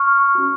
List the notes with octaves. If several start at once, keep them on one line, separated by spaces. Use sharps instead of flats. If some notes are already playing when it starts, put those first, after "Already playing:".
Already playing: C#6 F6
C#4 F#4